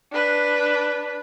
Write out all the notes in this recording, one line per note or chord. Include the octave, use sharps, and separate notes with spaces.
D4 B4